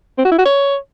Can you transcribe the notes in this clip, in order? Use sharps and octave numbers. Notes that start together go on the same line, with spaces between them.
C4
F#4
E4
F#4
C#5